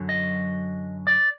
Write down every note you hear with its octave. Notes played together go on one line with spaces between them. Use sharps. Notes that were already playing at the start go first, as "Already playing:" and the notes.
Already playing: F#2 D3 F#3
D#5
D5